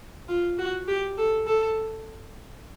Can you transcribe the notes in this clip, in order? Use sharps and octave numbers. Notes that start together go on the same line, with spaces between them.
F4
F#4
G4
A4
A4